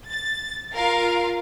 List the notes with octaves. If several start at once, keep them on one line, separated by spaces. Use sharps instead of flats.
A6
F4 A#4 F5